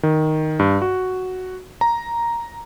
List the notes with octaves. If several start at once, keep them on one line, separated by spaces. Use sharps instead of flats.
D#3
G2
F#4
A#5